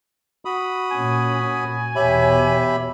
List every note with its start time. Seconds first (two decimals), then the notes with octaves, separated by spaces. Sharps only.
0.45 F#4 B5 D#6
0.91 A#2 C#4 G#5
1.96 E2 B2 G4 C#5 E5 B5